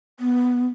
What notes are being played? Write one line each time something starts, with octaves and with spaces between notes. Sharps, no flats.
B3